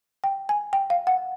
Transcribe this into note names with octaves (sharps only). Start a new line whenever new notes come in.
G5
G#5
G5
F5
F#5